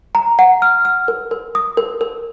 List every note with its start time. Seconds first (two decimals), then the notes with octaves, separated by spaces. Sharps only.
0.15 A#5
0.39 F#5
0.62 F6
0.85 F6
1.08 A#4
1.31 A#4
1.55 D#6
1.77 A#4
2.01 A#4